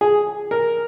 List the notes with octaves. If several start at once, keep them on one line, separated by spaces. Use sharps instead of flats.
G#4
A#4